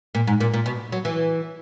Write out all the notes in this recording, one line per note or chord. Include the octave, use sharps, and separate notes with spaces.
A#2
G#2
A#2
A#2
B2
F#3
E3